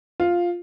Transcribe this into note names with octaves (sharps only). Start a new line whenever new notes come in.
F4